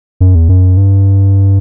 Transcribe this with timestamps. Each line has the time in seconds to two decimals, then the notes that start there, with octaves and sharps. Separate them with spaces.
0.21 F#2
0.35 E2
0.49 F#2
0.77 G2